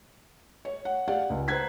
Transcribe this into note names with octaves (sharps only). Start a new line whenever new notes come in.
C#5
F#5
G4 D5 F5 F#5
C#2
B4 C5 A#5 F#6 G#6 B6